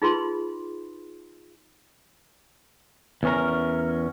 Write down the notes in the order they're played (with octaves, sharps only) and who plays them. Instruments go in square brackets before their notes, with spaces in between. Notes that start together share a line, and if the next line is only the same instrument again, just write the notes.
[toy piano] D#4 F4 G#4 B4 B5 C6
[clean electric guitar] E2 C#4 A#4